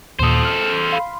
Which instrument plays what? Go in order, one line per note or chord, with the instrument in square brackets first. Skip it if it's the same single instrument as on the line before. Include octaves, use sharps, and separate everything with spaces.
[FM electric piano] D#2 A#2 D#6 [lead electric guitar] A4 C5
[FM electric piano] F6
F5 B5 C6